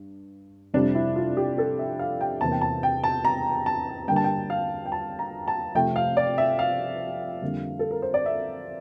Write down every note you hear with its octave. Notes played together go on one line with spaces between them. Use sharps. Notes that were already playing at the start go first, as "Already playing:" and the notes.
Already playing: G2
F2 C3 G3 D4
E4
F4
G4
A4
E5
F5
G5
E2 C3 E3 A#3 A5
G5
A5
G5
A5
A#5
A5
G2 D3 G3 A#3 G5
A5
G5
F5
G5
A5
A#5
A5
F2 C3 F3 A3 G5
F5
D5
E5
F5
F2 D3 G3 A#3
A4
A#4
C5
D5
E5